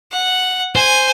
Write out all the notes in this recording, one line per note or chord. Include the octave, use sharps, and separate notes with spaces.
F#5
C5 G#5